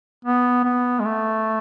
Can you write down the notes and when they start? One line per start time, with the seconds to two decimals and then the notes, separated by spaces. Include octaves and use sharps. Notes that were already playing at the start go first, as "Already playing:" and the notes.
0.25 B3
0.65 B3
1.00 G#3
1.05 A3